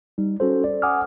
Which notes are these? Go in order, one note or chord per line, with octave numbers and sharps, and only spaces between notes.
G3 D#4
C#4 F#4 A4 C5
D5
F#5 G#5 D6 D#6 F6